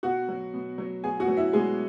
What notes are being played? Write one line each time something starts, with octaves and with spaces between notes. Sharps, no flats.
B2 F#4 F#5
F#3
B2
F#3
B2 G#4 G#5
F#4 F#5
F#3
E4 E5
B2 G#3 G#4